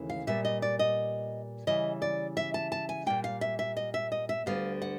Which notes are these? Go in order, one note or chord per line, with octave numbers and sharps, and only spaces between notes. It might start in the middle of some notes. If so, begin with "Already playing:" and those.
Already playing: D#2 C#3 E3 A3
F5
A#2 G3 B3 E5
D#5
D5
D#5
C#3 E3 G3 D#5
D5
E5
A5
A5
G#5
A#2 G3 A#3 G5
F5
E5
E5
D#5
E5
D#5
E5
D2 D3 G3 B3 F5
F#5